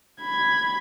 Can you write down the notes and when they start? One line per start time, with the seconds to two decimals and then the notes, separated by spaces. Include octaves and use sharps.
0.22 B5 G#6